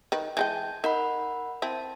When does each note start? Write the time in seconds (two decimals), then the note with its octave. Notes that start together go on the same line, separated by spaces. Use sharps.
0.12 D#3 B4
0.37 E3 G#3 G5 A5 G6 G#6
0.84 D#4 A#4 F#5 B5
1.62 C4 E4 A5